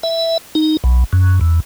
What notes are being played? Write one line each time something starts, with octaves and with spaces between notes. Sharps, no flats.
E5
D#4
B1
F#2
E2